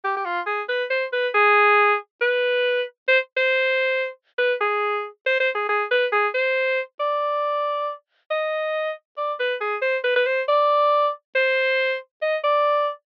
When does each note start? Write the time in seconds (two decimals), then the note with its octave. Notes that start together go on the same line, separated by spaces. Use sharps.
0.04 G4
0.16 G4
0.25 F4
0.46 G#4
0.69 B4
0.90 C5
1.13 B4
1.34 G#4
2.21 B4
3.08 C5
3.37 C5
4.38 B4
4.61 G#4
5.26 C5
5.40 C5
5.55 G#4
5.69 G#4
5.91 B4
6.12 G#4
6.34 C5
7.00 D5
8.31 D#5
9.17 D5
9.40 B4
9.61 G#4
9.82 C5
10.04 B4
10.16 B4
10.26 C5
10.48 D5
11.35 C5
12.22 D#5
12.44 D5